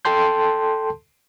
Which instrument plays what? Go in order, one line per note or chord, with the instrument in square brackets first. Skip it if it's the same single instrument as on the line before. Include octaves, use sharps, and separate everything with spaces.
[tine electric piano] A4 G5 A5 C6 G6